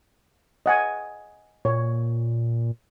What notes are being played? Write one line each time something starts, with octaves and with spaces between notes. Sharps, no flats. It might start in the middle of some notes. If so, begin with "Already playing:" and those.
D#5 F#5 G#5
A#2 C#5